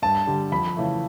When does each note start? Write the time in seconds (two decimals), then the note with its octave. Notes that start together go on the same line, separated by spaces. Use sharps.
0.02 G2 A5
0.27 D3 G3
0.52 F2 B5
0.76 C#3 E3 A3